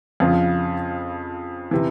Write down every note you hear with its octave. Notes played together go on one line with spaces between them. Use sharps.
F2 C#3 F3
C3 E3